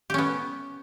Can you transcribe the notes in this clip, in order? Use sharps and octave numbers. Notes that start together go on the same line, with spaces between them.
B3 C#4 G4